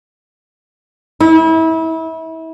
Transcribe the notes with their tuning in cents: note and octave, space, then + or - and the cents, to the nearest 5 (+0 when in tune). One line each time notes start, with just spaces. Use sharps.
E4 -30